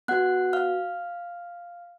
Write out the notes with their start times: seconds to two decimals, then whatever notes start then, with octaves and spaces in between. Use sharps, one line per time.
0.08 B3 F#4 F#5 F#6
0.53 F5 F6